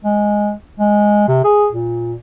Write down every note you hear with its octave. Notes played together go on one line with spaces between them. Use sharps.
G#3
G#3
C3
G#4
A#2